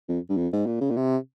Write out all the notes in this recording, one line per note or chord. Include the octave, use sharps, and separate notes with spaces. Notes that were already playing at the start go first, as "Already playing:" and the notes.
F2
G2
F2
G#2
A#2
C#3
A#2
C3